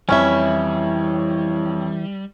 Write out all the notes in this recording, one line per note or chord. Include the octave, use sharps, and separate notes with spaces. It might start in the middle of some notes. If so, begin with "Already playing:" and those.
F2 E3 G3 C#4 E4 C#5 E5